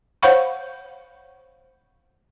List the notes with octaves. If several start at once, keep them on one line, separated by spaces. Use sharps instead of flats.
C5 C#5 F5 F#5 B5 C#6